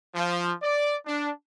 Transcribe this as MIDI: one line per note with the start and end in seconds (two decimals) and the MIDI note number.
0.14 0.52 53
0.62 0.96 74
1.05 1.29 62